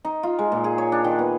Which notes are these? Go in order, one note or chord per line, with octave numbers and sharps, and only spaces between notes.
D#4
F4
G#3
A#2
G#4
C#5
D4
D#3
B3